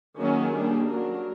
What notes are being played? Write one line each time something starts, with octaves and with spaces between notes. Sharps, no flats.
D#3 F#3 A#3 C#4 G#4
G3 A#3 D4
F#3 A#3 D4 A#4